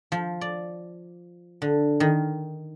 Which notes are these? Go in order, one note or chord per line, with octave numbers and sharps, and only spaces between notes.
F3
D5
D3
D#3